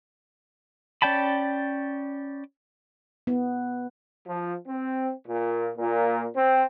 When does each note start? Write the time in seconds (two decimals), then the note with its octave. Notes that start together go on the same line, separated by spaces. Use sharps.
1.02 C#4 D5 G5 A5 B5
3.27 B3
4.27 F3
4.68 C4
5.27 A#2
5.77 A#2
6.36 C4